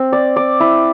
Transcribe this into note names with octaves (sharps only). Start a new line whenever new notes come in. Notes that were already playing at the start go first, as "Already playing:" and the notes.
Already playing: C4
D5
D5
E4